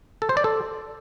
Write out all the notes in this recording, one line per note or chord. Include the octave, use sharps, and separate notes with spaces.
A4
C5
D5
A4